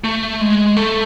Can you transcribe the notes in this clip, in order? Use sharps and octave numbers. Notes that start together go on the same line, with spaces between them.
A3
G#3
A3